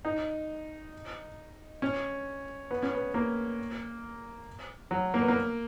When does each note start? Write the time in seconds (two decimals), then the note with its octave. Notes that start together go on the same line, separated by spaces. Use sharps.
0.05 D#4
1.82 C#4
2.71 B3
2.83 C#4
2.94 B3
3.14 A#3
4.91 F#3
5.14 A#3
5.21 B3
5.28 A#3